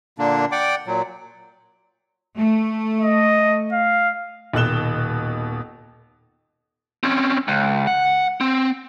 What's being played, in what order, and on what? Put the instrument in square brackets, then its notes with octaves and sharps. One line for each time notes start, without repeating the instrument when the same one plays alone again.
[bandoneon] A#2 D3 A#3 D4
D5 F#5 G5 D6
A#2 F#3
[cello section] A3
[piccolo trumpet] D#5
F5
[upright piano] D#1 B2 D#3 F#6 E7 G7
[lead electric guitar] C4 C#4
C#2
F#5
C4